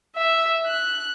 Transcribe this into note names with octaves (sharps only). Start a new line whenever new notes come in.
E5
F#6